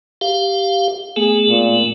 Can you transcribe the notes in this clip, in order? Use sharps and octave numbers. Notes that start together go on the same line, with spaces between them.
G4 F5
A3 B3 G#4
A#2